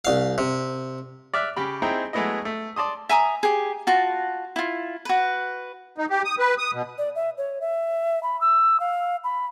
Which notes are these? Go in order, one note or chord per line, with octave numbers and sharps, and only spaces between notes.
C2 F5
C3
D5 E5 F6 F#6
C#3 G4 B5
C4 D#4 E4 G#4 G5 A#5
F#3 G#3 A3 B3 E4 D#5
A3
D5 A5 C6 D#6
E5 G#5 A#5 D#6
G4 G#4
F4 F#4 A5
E4 F4
F#4 B4
D#4
G4
D#6
B4
D#6
B2
D5
E5
C#5
E5
B5
E6
F5
B5